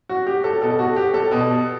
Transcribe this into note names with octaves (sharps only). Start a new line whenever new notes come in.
F#4
G4
A4
B2 A4
F#4
G4
A4
B2